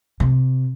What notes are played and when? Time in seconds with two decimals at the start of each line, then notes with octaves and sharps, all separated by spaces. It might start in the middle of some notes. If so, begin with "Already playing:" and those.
0.20 C3